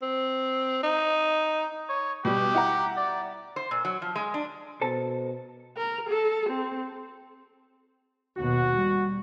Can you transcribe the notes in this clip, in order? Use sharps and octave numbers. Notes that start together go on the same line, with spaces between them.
C4
D#4
C#5
B2 G3 G4
E4 F#5 A#5
D5
C5
A#2
F#3
F3
G#3
D4
B2 A4 C5 A5
A#4
A4
C4
D#2 B2 F#4
G3